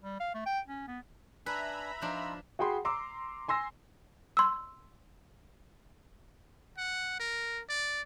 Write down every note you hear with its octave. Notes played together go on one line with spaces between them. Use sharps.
G3
F5
A3
G5
C#4
B3
D4 B4 E5 G#5 A#5 B5 E6
F3 D4 D#4 F4 E6
F#4 G#4 G5 B5 C6
A#5 C6 D6 E6
G#5 C6 E6 A#6
C6 E6
F#5
A#4
D5